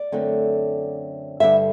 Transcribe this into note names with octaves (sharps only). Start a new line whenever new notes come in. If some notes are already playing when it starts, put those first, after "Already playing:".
Already playing: D5
F#2 D3 A3 C4
G2 D3 G3 D4 E5